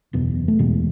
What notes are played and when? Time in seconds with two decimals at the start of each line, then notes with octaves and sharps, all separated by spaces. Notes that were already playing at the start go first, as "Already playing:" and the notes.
0.13 F#1 E2 B2
0.48 A3
0.59 F#1 E2 B2 E3 G#3